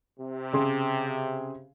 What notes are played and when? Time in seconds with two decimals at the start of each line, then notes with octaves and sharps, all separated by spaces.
0.20 C3
0.53 C#3 G#4 C6